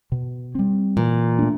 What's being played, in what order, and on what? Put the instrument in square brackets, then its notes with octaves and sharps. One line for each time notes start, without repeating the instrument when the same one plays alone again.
[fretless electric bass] B2
G3 C4
[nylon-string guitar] A#2 [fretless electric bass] E3
[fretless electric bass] A3 D4